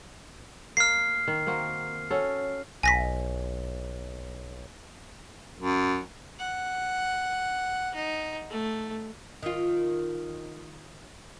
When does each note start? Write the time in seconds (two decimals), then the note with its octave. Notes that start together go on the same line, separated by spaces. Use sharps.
0.77 A#3 F6 C7
1.28 D#3
1.47 A#3 C4 F#4
2.10 C#4 F#4 A4
2.83 B1 G#5 A#6 B6
5.60 F#2
6.39 F#5
7.95 D#4
8.50 A3
9.43 D#3 F4